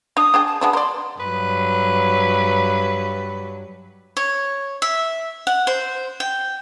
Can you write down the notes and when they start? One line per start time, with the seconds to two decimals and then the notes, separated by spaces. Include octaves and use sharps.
0.17 D4 D#6
0.34 D4 G#4 G5
0.47 A5
0.61 G#3 B3 D4 A5
0.73 A#4 D5 C6
1.20 G2 F#3 B4
4.17 C#5
4.82 E5
5.47 F#5
5.67 C5
6.20 G5